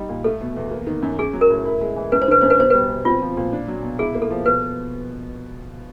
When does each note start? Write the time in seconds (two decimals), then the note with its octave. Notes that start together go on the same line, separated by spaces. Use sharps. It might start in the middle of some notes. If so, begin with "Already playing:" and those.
Already playing: G3 D#4
0.09 A#2
0.24 A3 A4
0.41 B2
0.57 E2
0.71 A#3
0.87 D#3
1.02 F#2
1.19 C#4 G#4
1.33 F#3
1.41 A#4
1.50 A2
1.65 E4
1.81 G#3
1.96 E3
2.12 F#2 B4
2.22 C5
2.28 D3 B4
2.41 F#2 C5
2.50 B4
2.58 B2 C5
2.70 G3 B4
2.90 B2
3.05 C4 F4
3.21 F3
3.37 A#2
3.53 D4
3.68 F#3
3.83 B2
3.98 E4 G#4
4.14 A#3
4.22 A4
4.30 F3
4.46 B2 B4